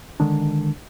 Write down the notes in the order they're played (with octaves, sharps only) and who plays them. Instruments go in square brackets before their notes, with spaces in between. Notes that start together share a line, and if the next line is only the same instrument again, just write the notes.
[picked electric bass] D3 D#3 G#3 D4